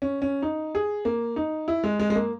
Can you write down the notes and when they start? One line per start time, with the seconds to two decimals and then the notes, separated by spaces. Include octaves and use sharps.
0.02 C#4
0.22 C#4
0.42 D#4
0.75 G#4
1.05 A#3
1.36 D#4
1.68 E4
1.84 G#3
1.99 G#3
2.10 G#3
2.15 A#3